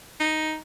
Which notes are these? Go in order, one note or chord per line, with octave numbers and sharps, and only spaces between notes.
D#4